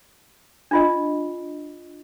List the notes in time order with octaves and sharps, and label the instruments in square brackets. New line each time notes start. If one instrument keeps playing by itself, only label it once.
[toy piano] D4 F4 D#5